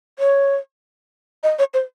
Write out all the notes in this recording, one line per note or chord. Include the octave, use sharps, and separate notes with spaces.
C#5
D#5
C#5
C5